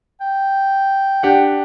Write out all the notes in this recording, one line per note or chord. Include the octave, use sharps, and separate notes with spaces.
G5
D4 G4 F#5